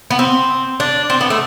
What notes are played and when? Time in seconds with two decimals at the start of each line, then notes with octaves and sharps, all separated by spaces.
0.11 B3
0.19 C4
0.80 D4
1.10 C4
1.21 B3
1.30 A3